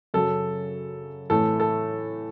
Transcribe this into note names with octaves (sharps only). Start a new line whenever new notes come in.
F#2 C#3 F#3 A4
A2 E3 A3 A4
A4